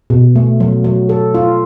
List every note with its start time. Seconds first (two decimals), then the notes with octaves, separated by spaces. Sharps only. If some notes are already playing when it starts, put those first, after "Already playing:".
0.10 B2
0.36 A3
0.60 F#3
0.84 F#3
1.09 A4
1.34 F4